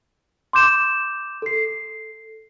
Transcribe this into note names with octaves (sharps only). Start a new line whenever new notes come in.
C6 D6 G6 E7
A4 C7